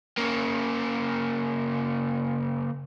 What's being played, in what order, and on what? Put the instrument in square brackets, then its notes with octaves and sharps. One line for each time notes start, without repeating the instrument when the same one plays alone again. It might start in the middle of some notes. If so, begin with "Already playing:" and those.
[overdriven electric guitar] C#3 A#3